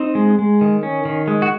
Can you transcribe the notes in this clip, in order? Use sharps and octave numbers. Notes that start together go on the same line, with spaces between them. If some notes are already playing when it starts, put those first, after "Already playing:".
Already playing: C4 D#4
G#3
G#3
D#3
C#4
D#3
G#3
F#4